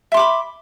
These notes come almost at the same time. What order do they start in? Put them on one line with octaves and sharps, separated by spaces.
E5 C6 D6 B5